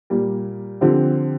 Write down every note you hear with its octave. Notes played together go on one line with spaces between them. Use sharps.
A#2 G3 A#3
D3 F3 C4 G4